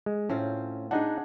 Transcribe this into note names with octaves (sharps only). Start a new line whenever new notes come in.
G#3
A2 C4 C#4 F4
D4 D#4 G#4 F#5